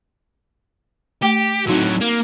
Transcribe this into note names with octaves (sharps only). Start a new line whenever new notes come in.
A3 G4 G5 D6
A2 F#3 C4 D#4 F#4
A#3